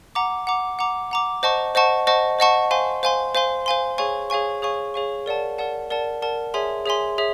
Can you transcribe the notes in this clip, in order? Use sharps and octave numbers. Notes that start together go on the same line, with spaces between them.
F#5 A#5 D6
F#5 A#5 D6
F#5 A#5 D6
F#5 A#5 D6
C5 D#5 F#5 A5 C#6
C5 D#5 F#5 A5 C#6
C5 D#5 F#5 A5 C#6
C5 D#5 F#5 A5 C#6
C5 F5 G#5 C6
C5 F5 G#5 C6
C5 F5 G#5 C6
C5 F5 G#5 C6
G#4 C#5 F5 G#5 C#6
G#4 C#5 F5 G#5 C#6
G#4 C#5 F5 G#5 C#6
G#4 C#5 F5 G#5 C#6
A#4 D5 F#5 A5
A#4 D5 F#5 A5
A#4 D5 F#5 A5
A#4 D5 F#5 A5
G#4 C#5 E5 G#5 C6
G#4 C#5 E5 G#5 C6
G#4 C#5 E5